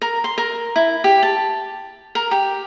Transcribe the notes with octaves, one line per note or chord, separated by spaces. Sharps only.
A#4
C6
A#4
E4
G4
A5
A#4
G4